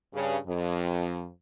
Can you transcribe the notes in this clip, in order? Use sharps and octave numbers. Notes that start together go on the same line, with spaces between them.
G2 C#3
F2